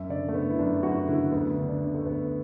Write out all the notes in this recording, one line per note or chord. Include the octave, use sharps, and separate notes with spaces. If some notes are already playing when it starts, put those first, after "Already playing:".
Already playing: F#2 E5
D3 D5
A3
D3 B3
E4
F#2 D4
F#2 F#4
D3 E4
D2 B3
D3
D4
D3
A3
D2 B3